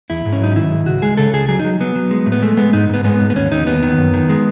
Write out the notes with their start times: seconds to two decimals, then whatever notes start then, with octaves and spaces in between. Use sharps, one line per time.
0.10 E2 E4
0.25 G#2
0.33 C#4
0.41 F#3 D#4
0.56 D#3 E4
0.71 G#2
0.86 C#2 F#4
1.02 G#3 G#4
1.17 C#3 A4
1.33 C#2 G#4
1.48 F#3 G#4
1.59 D#4
1.65 F#3
1.80 F#3 B3
1.96 F#3
2.11 G#3
2.26 A2
2.32 B3
2.42 G#3 A3
2.57 G#3 B3
2.73 G#2 D#4
2.89 G#2 B3
3.04 G#3 B3
3.21 G#2
3.30 B3
3.35 D#2 C#4
3.51 D#2 D#4
3.66 D#2 B3
3.83 D#3
3.98 F#2
4.14 D#3
4.29 G#3